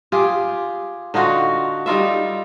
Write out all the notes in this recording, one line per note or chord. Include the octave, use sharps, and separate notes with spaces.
F4 G4 G#4
D3 D#4 F4 F#4
G3 D#4 F4 E5